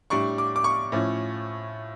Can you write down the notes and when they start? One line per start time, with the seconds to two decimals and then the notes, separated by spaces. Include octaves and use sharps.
0.10 A2 G3 D4 C#6
0.38 D6
0.56 D6
0.64 C#6
0.92 A2 F3 C#4